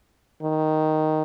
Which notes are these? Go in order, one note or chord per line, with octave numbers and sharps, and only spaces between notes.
D#3